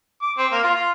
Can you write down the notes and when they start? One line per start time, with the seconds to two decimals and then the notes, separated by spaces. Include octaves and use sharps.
0.22 D6
0.38 C4
0.52 A#3
0.63 F4
0.76 F4